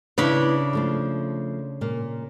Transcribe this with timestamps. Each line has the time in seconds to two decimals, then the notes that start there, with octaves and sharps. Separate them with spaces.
0.18 C#3 D4 E4 B4 B5
0.73 F3 A3 F4
1.81 A#2 A#3